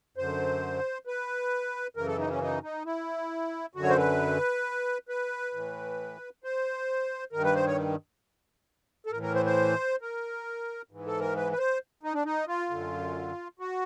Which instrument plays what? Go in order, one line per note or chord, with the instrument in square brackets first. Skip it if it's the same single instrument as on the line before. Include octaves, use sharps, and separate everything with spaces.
[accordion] F#2 D3 C5
B4
F#2 C#3 E3 A#4
A4
D#4
C#4
D#4
D#4
E4
F#2 D3 F#4
C#5
C5
B4
B4
A2 E3
C5
G2 D#3 A#4
B4
C5
C#5
A4
A2 E3 A#4
A#4
C5
C5
A#4
G#2 E3
A4
A#4
B4
B4
C5
D#4
D4
D#4
F4
F#2 D3
F#4